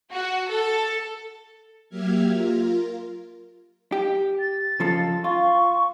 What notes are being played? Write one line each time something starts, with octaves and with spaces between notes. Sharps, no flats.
F#4
A4
F#3 A#3 G4 E5 F6 G#6
F4 A#4
G4
A6
C#3 F3 A4
F4 C#6